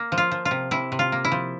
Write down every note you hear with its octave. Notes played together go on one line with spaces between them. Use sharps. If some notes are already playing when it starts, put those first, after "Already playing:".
Already playing: A#3
F3
F4
F3
F4
C3
C3 E4
C3
F4
A#3
E4
F3